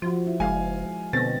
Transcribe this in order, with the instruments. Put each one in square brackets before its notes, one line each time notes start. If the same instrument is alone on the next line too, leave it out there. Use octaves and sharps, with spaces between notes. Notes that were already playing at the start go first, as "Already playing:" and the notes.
[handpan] F3 F#4 [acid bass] F4
[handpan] E4
[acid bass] F#1 [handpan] G#3 [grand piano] F5 G#5
[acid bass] B2 [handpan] D3 B3 C4 [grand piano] A6 A#6